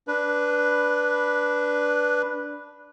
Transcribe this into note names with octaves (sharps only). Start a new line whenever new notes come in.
D4 B4